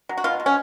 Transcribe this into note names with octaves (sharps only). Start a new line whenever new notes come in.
F#3
F#4
B2 F4
B2
C#4